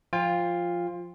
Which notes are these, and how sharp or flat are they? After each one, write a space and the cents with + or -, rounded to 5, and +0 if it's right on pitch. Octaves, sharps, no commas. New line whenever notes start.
F3 +0 F4 +0 G5 +40